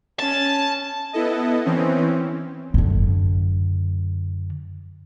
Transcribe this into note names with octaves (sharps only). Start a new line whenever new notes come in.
C#4 A5
B3 E4 A4 D#5
E3 C4 C#4
F#2 D3